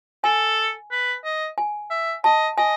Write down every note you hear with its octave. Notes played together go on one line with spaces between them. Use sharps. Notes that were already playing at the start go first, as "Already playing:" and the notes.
A4 G#5
B4
D#5
G#5
E5
D#5 A5
D#5 G#5